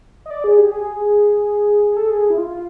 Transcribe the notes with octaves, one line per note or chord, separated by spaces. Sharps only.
D#5
D5
G#4
G4
G#4
G#4
A4
G#4
E4
F4
F4